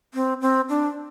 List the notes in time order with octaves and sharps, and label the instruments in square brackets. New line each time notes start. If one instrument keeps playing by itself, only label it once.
[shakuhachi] C4
C4
D4